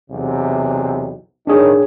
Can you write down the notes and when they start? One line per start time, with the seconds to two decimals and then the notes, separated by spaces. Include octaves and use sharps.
0.10 B1 E2 C3
1.47 A2 D#3 D4 G#4 C#5